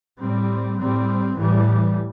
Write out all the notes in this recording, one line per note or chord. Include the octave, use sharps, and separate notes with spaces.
A2 G3 C4
A2 G3 C4
A2 E3 G3